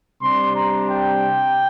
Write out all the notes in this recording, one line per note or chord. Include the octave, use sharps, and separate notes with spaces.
C3 G3 D4 C6
A#5
G5